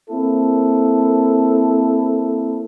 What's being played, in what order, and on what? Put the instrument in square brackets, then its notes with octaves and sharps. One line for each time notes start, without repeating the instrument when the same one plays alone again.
[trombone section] A#3 C4 E4 A4